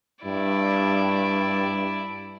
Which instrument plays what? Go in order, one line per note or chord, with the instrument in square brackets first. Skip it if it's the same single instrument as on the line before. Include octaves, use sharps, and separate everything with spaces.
[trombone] G2 [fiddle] E4 D5